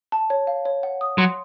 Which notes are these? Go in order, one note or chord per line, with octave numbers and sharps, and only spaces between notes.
A5
C#5
F5
C#5
F#5
D#6
F#3 C6